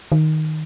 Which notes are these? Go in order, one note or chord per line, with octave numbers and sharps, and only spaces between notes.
D#3